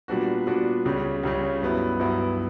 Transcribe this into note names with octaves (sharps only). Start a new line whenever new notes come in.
A#2 G3 B3 D4 F#4
A#2 G3 B3 D4 F#4
C#2 C#3 G3 C#4
C#2 C#3 G3 C#4
G2 F#3 B3 E4
G2 F#3 B3 E4